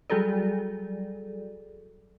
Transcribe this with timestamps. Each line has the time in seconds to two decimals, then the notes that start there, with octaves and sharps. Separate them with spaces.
0.10 F#3 G3 F#4 G#4 A4 D5